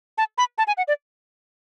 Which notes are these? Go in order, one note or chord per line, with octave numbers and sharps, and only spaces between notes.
A5
B5
A5
G#5
F#5
D5